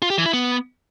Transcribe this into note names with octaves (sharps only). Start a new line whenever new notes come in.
F4
G4
E3
E4
B3